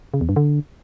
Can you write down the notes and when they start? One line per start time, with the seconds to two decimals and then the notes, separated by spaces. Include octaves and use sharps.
0.14 C#3
0.21 E2
0.29 G2
0.36 D3